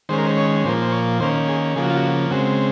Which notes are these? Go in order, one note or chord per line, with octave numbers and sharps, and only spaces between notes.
D#3 G#3 C#4 C5
A#4
C5
C#5
A#2 F3 A#3 C5
C5
C#5
D#3 A#3 C#4 C5
G#4
C#3 F3 A#3 G#4
F#4
F4
F#4
C#3 G#3 C4 F#4